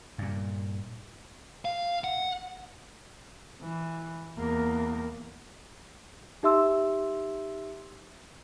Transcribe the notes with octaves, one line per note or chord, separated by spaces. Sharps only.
G2 A#2
F5
F#5
E3
E2 A#3
D#4 G4 E5 C6 E6